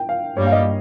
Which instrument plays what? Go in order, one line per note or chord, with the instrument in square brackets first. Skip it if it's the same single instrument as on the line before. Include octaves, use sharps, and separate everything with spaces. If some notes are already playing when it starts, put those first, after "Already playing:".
Already playing: [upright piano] G5
F5
[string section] G2 G3 A#3 [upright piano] C#5
[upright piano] F5
D#5